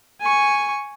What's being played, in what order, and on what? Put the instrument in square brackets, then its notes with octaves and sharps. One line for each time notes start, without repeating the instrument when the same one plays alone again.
[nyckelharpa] G#5 C#6